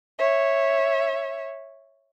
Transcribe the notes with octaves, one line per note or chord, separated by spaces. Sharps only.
C#5 E5